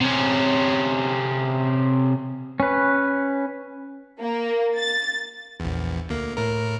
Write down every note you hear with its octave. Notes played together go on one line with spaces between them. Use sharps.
C3 C#4
C#4 B4
A#3
A6
A#1 E2
D2 A#3
A2 A#4